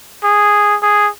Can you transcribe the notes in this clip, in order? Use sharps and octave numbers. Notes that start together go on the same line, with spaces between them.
G#4
G#4